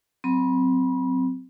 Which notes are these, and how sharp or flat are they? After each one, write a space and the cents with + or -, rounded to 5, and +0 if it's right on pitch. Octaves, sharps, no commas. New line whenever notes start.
F#3 +0 C4 -15 B5 -30